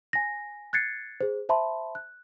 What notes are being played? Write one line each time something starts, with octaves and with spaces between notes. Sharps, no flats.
G#5 A#6
F#6 G#6 A6 C7 C#7
G#4 C5
C5 E5 A5 B5 C6
F#6